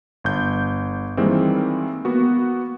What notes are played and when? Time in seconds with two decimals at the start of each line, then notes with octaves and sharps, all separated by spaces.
0.24 G1 G6
1.17 D#3 E3 G3 G#3 A#3 C4
2.05 A#3 B3 F#4